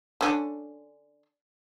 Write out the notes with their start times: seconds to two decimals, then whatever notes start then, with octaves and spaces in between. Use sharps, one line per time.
0.21 D3 C#4 D4